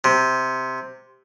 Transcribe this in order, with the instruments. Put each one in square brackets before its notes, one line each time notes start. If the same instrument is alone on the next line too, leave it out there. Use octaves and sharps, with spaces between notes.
[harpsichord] C3